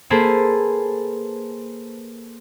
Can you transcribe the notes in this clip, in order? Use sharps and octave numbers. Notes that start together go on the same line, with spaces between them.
A#3 G#4 A4 B4 C5 G#5